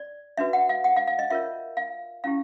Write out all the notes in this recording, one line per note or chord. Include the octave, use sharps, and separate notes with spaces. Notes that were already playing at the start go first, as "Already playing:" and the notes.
Already playing: D5
D4 F#4 B4 E5
F#5
F5
F#5
F5
F5
D#5
F4 A#4 C#5 E5
F5
C#4 E4 G4 F5